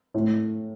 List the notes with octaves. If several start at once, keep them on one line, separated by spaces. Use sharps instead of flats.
A2